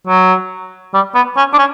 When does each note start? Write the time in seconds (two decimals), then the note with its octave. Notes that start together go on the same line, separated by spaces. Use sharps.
0.07 F#3
0.94 G3
1.15 B3
1.37 C#4
1.53 D4
1.58 C#4